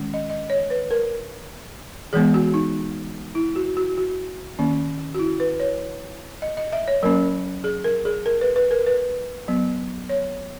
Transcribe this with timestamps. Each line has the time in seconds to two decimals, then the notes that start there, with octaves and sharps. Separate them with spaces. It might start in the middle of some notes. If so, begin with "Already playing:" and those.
Already playing: D#3 G#3 C#4
0.14 D#5
0.30 D#5
0.50 C#5
0.70 B4
0.91 A#4
2.13 E3 G#3 B3 G#4
2.34 F#4
2.54 D#4
3.35 E4
3.56 F#4
3.77 F#4
3.98 F#4
4.59 D#3 A#3 C#4
5.14 F#4
5.19 E4
5.40 B4
5.60 C#5
6.42 D#5
6.57 D#5
6.73 E5
6.88 C#5
7.03 F#3 A#3 C#4 A#4
7.64 G#4
7.84 A#4
8.05 G#4
8.26 A#4
8.41 B4
8.56 B4
8.71 A#4
8.86 B4
9.48 F#3 B3
10.09 C#5